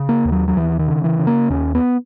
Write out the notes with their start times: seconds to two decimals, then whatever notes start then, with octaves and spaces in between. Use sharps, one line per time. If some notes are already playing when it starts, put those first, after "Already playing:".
Already playing: C#3
0.09 A#3
0.25 D#2
0.32 F#3
0.48 F#3
0.56 D#2 E3
0.79 D#3
0.88 C#3
1.04 E3
1.19 C#3
1.27 A#3
1.50 D#2 C#4
1.75 B3